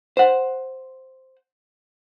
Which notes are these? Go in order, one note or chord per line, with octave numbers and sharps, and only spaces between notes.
C5 F#5